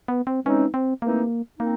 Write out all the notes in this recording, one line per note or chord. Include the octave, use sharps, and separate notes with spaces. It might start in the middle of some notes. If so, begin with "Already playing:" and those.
B3
C4
E3 G#3 C4 C#4 D#4
C4
E3 A3 A#3 C4 D#4 G4
A#3 C4 D#4